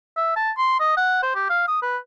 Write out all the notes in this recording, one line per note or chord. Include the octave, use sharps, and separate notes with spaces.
E5
A5
C6
D#5
F#5
C5
G4
F5
D#6
B4